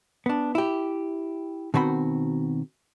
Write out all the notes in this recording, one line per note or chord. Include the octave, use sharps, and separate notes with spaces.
B3 D4
E4 G4
B2 D#3 C4 F#4 B5